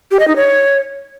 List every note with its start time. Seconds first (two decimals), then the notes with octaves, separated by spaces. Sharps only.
0.11 G4
0.19 D#5
0.28 D#4
0.36 C#5